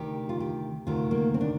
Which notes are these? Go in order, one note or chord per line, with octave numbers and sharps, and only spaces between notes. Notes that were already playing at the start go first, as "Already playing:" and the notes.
Already playing: D2 C3 D#3 G4
F4
G4
D2 C3 D#3 F4
A#3
C4
D4